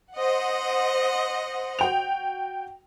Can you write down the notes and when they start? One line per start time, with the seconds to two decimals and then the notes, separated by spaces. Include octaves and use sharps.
0.14 C5 D#5 F#5
1.79 F#4 G5 F7